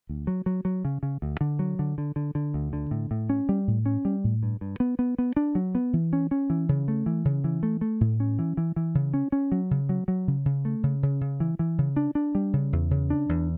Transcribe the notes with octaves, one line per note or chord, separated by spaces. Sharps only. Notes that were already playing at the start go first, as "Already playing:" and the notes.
D2
F#3
F#3
F#3
C#3
C#3
D2
D3
F#3
D3
D3
D3
D3
D2
D3
A2
A2
C#4
G3
A2
C#4
G3
A2
G2
G2
B3
B3
B3
D4
F#3
B3
E3
C#4
C#4
E3
C#3
A3
E3
C#3
E3
A3
A3
A2
C#4
E3
E3
E3
C#3
C#4
C#4
F#3
C#3
F#3
F#3
C#3
C#3
A3
C#3
C#3
C#3
E3
E3
C#3
D4
D4
G3
C#3
E2
C#3
D4
E2